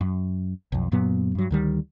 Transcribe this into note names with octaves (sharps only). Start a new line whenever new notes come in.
F#2
B1 F2
F#2 A#2 F#3 B3
G2 F#3
D2 D#3 G3